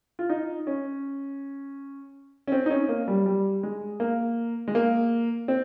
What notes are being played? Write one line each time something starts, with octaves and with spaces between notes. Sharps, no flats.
F4
D#4
C#4
C#4
C4
D#4
C#4
A#3
G3
G3
G#3
A#3
G#3
A#3
C4